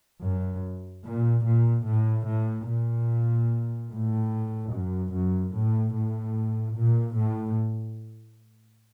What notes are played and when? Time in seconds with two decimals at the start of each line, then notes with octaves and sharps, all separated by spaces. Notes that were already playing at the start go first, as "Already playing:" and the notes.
0.23 F#2
1.05 A#2
1.45 A#2
1.86 A2
2.27 A2
2.68 A#2
3.90 A2
4.72 F#2
5.12 F#2
5.53 A2
5.93 A2
6.75 A#2
7.16 A2